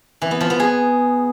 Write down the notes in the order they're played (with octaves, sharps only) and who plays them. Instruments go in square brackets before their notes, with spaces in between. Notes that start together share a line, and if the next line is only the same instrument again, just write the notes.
[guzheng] E3
B3
F3
B3
G#4